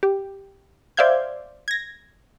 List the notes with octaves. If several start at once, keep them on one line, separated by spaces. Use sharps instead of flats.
G4
C5 D5 E5 F5 G6 G#6
G#6 A#6